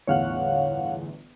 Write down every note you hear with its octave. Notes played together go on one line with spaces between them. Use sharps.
G1 E2 A2 C#5 F5 F#5